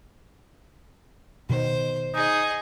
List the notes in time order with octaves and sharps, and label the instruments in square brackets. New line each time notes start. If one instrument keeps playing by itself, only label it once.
[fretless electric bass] B2 D#3 [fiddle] C5
[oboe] D#4 [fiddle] G#4 D#5